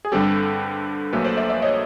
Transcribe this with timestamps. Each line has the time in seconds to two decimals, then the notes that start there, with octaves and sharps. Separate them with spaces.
0.05 G#4
0.12 G2 D3 G3 C4 G4 A4
1.13 A#1 A#2 F#3 A3 A4 B4
1.25 C5 D5
1.37 D5 E5
1.49 D5 E5
1.62 C#5 D#5